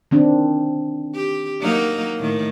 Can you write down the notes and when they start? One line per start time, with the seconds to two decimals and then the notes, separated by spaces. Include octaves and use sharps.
0.11 D#3 C4 D4
1.14 G4
1.60 F#3 A#3 D#4
2.18 A2 D#3